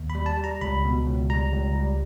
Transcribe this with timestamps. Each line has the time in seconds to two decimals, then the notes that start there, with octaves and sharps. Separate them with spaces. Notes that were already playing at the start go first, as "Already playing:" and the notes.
Already playing: D#2
0.10 B5
0.15 G3
0.26 A5
0.37 G3
0.44 A#5
0.61 C#2 B5
0.85 B2
1.07 C#2
1.30 G3 A#5
1.53 C#2
1.76 G3